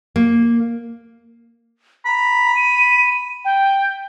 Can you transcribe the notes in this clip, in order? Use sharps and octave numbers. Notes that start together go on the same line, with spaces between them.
A#3
A#5 B5
D#7
G5